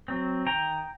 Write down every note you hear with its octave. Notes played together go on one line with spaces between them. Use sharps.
F#3 C4
D#3 G5 A#5